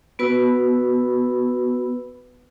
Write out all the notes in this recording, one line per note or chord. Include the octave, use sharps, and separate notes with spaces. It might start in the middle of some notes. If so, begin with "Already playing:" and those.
B3 F#4 B4 B5 E6